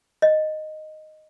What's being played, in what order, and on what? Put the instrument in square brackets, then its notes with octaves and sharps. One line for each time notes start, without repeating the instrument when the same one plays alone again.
[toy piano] D#5